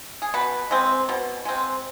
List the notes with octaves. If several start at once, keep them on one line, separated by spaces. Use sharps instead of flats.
G#4
B2 B4
G#3 C4
B2
G#3 C4